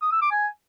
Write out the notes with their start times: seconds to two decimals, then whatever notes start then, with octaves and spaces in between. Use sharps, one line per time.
0.02 D#6
0.12 E6
0.22 D6
0.31 G#5